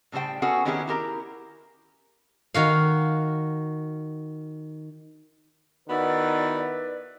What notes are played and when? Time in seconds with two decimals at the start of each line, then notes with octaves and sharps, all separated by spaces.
0.12 A2 C#3 G3 C5 G5
0.42 B3 C#4 F#4 G#4 A4
0.65 D#3 B3 C#4 E4 G4 G#4
0.87 E4 G4 A#4 A#5
2.54 D#3 F#4 F5
5.89 D#3 B3 E4 F#4 B4 D5